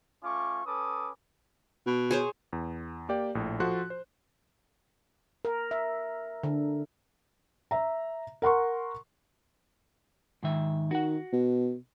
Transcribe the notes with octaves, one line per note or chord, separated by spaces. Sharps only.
A3 C#4 F4 C#6 D6
C#4 A4 B4 D6 D#6
B2
G#4 C5 C#5
E2
A#3 G4 D5 G5
A#1 A2
F3 F#4 A4 C6 F#6
C5
A#4
E5
D3
E5 A#5
A#4 F#5 C6 C#6
G#2 D#3 E5
D#3 F#4 F#5
B2